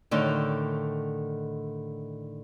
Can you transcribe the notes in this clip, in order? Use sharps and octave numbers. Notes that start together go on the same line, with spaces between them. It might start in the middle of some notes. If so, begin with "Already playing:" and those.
A2 D3 D#3